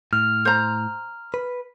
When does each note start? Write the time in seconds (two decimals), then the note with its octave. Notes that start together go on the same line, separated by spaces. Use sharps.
0.13 A2 F6
0.45 C5 A#5
1.34 B4